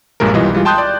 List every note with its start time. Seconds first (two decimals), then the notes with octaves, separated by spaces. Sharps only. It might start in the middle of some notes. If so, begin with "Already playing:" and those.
0.20 A#1 G2 A#2 G#3 A#4
0.34 B1 E3 G3 F4 D#5
0.53 E3 G3 G#3 F4
0.65 G5 A5 C6 D#6 F#6 G6
0.78 D5